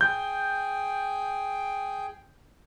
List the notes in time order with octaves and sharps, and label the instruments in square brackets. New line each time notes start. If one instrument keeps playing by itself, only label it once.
[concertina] G#4 G5 [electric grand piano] G6